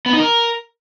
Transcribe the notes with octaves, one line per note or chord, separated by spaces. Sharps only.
B3
D#4
A#4